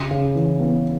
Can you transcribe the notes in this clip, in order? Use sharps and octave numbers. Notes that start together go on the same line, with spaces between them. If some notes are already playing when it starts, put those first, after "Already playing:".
Already playing: C#3
C#3
E3
B3